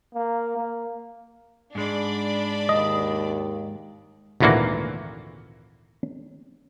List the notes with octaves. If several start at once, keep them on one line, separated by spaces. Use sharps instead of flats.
A#3
A#3
G#2 G#3 D4 D5 B5
D#2 D#5
G#1 D2 A#2 E3 A#3 F#4